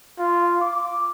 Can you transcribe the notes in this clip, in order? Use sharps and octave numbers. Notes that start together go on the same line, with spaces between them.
F4
D6